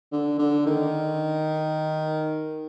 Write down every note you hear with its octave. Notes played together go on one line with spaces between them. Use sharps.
D3
D3
D#3